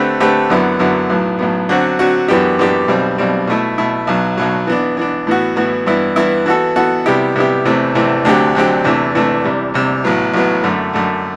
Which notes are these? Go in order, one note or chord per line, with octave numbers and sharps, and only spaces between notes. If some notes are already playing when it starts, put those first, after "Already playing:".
Already playing: D3 A3 C4 G4 B4
D3 A3 C4 G4 B4
F#2 D3 F#3 B3 E4
F#2 D3 F#3 B3 E4
B1 A2 F#3 B3
B1 A2 F#3 B3
D3 F#3 C4 F#4
D3 F#3 C4 F#4
F#2 E3 B3 D4 G4
F#2 E3 B3 D4 G4
B1 B2 G3 C4
B1 B2 G3 C4
B2 A3 E4
B2 A3 E4
B1 B2 F#3
B1 B2 F#3
E3 B3 D4
E3 B3 D4
A2 E3 B3 F#4
A2 E3 B3 F#4
G2 E3 B3 E4
G2 E3 B3 E4
E3 B3 F#4 A4
E3 B3 F#4 A4
C3 G3 B3 E4 G4
C3 G3 B3 E4 G4
E2 C3 E3 A3 C4
E2 C3 E3 A3 C4
D2 D3 F#3 C4 G4
D2 D3 F#3 C4 G4
E2 C3 E3 A3 D4
E2 C3 E3 A3 D4
E2 C3 G3
E2 C3 G3
A1 A2 F#3 B3
A1 A2 F#3 B3
F#2 D3 A3
F#2 D3 A3